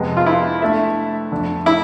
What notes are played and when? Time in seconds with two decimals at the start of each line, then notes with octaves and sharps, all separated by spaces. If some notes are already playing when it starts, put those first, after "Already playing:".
Already playing: F2 C3 G#3 B3
0.17 F4
0.26 E4
0.62 A3 D4 A4 E5
1.32 F2 D3 A3 D4
1.66 E4